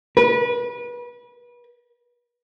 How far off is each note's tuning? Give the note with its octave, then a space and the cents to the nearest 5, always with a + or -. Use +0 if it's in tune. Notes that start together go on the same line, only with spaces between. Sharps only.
B4 -30